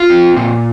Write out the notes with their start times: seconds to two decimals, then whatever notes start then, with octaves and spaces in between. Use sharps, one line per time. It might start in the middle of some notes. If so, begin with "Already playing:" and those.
Already playing: F4
0.10 C4
0.37 A#2